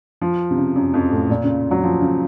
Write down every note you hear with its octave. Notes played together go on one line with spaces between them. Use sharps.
F3
C3
C#3
F#2
F2
A2
A#2
C#3
F#3
F3
C#3